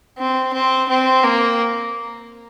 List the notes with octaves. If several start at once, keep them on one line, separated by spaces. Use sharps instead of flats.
C4
C4
C4
A#3